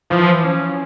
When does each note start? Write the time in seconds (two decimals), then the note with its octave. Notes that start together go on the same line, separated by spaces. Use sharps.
0.10 E3 F3
0.44 C#4